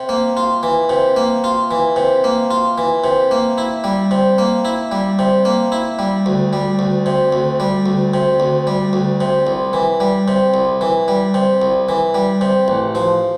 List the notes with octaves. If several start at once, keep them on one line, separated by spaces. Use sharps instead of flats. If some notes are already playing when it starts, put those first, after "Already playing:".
Already playing: C3
A#3
F4
E3
C3
A#3
F4
E3
C3
A#3
F4
E3
C3
A#3
E4
G3
C3
A#3
E4
G3
C3
A#3
E4
G3
D2
G3
D2
C3
D2
G3
D2
C3
D2
G3
D2
C3
C2
E3
G3
C3
C2
E3
G3
C3
C2
E3
G3
C3
A1
F3